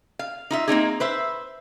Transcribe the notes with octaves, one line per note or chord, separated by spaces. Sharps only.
F5
D#4 F4 E5
A#3 C4 D#4 G#4
B4 C5 E5